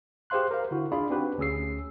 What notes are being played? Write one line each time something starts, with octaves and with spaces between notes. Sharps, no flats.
G4 G#4 C5 F5 C6 F#6
A#4 C5 F5
D3 E4 F#4
D4 F4 G#4 D5 F5 B5
C4 D4 D#4 F#4 G4 B4
D2 C#4 G#4 E6 C7